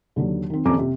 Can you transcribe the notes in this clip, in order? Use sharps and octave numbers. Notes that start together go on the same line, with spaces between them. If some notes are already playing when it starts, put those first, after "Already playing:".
D#2 D3 F#3
D#3 C4
D#1 F2 C#4 A4 A#5 D6
C3